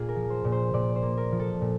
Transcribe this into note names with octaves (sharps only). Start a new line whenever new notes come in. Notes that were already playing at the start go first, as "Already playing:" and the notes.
Already playing: A#2 A#3 F4 G#4
A#4
F3
C5
A#2
C5
A#2 D5
C5
A#3
A#4
F3
A4
A#2